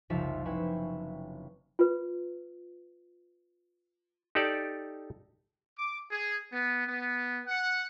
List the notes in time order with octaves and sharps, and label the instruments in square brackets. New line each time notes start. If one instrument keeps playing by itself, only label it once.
[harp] F#1 C2 F3 D#4 F4 E5
C4 C#4 E4 B4 E5
[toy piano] F4 B4
[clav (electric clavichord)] D#4 G4 A4 D5
[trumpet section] D6
G#4
B3
B3
F#5